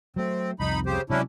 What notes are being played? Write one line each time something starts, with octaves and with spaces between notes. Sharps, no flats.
F#3 A3 C4
C2 F2 D#4 B5
C#3 G4 C5
C3 F#3 G#3 C#4 D4 E4